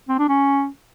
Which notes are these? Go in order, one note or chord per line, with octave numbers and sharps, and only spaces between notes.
C4
D4
C#4